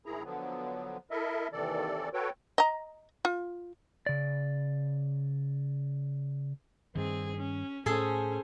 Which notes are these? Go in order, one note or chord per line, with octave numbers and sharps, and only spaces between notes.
D2 G#2 D#3 E4 G#4 A#5
D3 F3 F#3 B3
E4 A4 A#4 D#5 E5
D#2 C3 D#3 E3 A4 D5
F#4 A4 B4 C#5 G5
D#5 A#5
F4
C#3 D5
G2 D#3 C4 G#4
C#4
A2 C#4 G#4 A4 C5